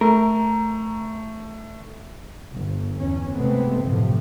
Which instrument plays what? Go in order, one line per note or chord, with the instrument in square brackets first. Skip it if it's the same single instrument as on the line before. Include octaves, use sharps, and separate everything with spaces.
[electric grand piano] A3 [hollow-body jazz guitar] A#4
[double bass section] G1
E2 C#4
C3 G#3 A3 B3 C4
F#2 A2 C3 F3